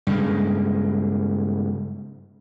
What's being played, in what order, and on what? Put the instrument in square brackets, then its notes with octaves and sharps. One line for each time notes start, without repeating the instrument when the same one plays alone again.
[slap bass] G2 C#3 G#3